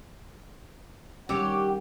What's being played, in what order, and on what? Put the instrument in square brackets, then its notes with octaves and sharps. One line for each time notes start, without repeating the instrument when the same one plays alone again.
[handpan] D#3 G3 C#4 [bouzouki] G4 [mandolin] C#5 D6 E6 [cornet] F#5